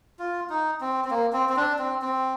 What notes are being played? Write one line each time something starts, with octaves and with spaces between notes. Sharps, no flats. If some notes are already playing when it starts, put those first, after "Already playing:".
F4
D#4
C4
C4
A#3
C4
C4
D4
C4
C4